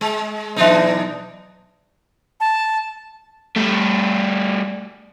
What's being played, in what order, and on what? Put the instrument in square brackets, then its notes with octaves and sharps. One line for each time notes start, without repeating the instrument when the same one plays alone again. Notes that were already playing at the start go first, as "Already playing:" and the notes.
[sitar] G#3
[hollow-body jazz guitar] B1 E5 [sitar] E3 D4 D#4
[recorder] A5
[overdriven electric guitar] G3 A3